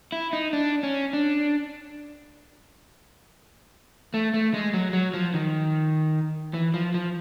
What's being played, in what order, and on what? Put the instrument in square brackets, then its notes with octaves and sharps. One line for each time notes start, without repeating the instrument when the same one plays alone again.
[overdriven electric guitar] E4
D#4
D4
C#4
D4
A3
A3
G#3
F#3
F#3
F3
D#3
E3
F3
F3